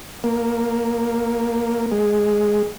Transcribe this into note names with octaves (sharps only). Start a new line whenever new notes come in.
A#3
G#3